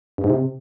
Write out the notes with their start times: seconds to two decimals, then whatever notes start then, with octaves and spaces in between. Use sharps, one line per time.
0.18 G2
0.24 G#2
0.30 C3